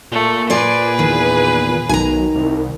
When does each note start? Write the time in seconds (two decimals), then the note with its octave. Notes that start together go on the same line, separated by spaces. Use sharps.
0.12 A#2 A3
0.50 G#4 B4 C5 D5
0.99 E2 D#3
1.89 B1 D#3 G#5 A#5
2.35 C2